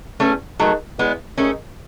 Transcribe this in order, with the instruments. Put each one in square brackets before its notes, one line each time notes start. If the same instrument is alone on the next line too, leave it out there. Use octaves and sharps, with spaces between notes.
[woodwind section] E2 [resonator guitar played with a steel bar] A3 C#4
[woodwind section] D#3 G#3 D#4 [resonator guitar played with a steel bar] F#3 A3
[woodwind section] E2 [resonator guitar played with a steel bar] G#3 B3
[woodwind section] D#3 G#3 D#4 [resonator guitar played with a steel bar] A3 C#4